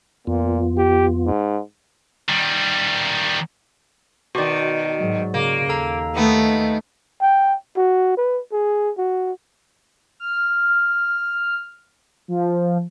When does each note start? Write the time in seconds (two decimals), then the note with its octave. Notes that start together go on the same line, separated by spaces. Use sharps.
0.27 F2 A#2 B3 F4
0.77 G4
1.26 G#2
2.28 D#3 G3
4.35 B2 D#3 F#4 D5
4.99 G#2 F#3
5.34 C#3 A#3
5.69 D#2 A4 F5 A#5
6.16 D#3 A3 B3
7.22 G5
7.77 F#4
8.17 B4
8.52 G#4
8.98 F#4
10.20 F6
12.28 F3